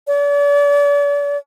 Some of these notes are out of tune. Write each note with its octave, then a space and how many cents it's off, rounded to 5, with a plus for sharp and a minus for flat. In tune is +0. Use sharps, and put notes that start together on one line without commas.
D5 -40